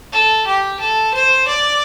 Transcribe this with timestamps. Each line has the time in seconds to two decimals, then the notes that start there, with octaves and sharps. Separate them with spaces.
0.12 A4
0.46 G4
0.80 A4
1.14 C5
1.48 D5